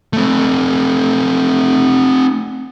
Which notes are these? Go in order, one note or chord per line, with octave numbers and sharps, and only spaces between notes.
A3 C4